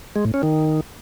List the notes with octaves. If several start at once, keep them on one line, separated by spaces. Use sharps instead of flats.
G#3
A2
C#4
D#3